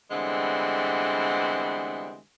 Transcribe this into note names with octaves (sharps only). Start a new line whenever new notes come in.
D3 E3 G3 G#3 B3 C4